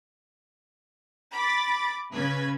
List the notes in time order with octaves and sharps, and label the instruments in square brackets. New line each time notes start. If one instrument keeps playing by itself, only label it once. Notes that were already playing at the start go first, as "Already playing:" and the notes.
[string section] B5 D6 A6
C#3 B4 G#6